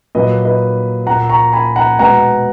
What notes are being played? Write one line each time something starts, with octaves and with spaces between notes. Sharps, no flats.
A#2 F#3 A#3 B4 D#5
B4 D#5
A#2 A#3 F#5 A#5
A#5 C#6
G#5 B5
F#5 A#5
B2 G#3 B3 F#5 A#5